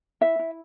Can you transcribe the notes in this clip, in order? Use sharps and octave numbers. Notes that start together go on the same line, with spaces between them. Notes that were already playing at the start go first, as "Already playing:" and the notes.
E4 E5
E4